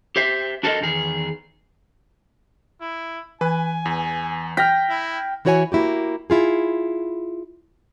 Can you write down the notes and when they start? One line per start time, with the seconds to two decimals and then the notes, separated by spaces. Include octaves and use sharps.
0.16 G4 C5 E5
0.63 D4 F#4 A4 A#4 D5 D#5
0.80 E2 D#3 G#4
2.81 E4
3.41 E3 B4 G#5
3.86 E2
4.57 G5 F6 A#6 B6
4.90 E4
5.45 E3 E4 F#4 C#5 D5 G#5
5.72 A#3 E4 F#4 G4
6.30 E4 F4 G#4